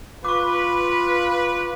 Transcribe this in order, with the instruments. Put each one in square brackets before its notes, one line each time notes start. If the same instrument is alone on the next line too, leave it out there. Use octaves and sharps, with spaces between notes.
[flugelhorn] F4 [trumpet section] B4 [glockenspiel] C#6 D6